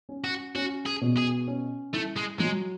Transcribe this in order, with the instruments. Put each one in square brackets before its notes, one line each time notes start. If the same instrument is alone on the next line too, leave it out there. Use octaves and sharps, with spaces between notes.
[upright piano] C#4
[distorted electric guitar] F#4
[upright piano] C#4 [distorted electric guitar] F#4
[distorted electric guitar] G#4
[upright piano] B2
[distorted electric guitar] G#4
[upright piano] C#4
[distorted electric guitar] A3 [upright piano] E4
[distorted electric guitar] G#3
[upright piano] F#3 [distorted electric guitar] G#3